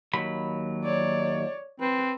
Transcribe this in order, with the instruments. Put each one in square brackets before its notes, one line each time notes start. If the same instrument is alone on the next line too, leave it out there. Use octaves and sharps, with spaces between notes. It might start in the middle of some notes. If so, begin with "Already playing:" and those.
[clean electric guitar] D#2 F#3 B5
[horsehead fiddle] C#5 D5
[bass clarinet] C4 [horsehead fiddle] B4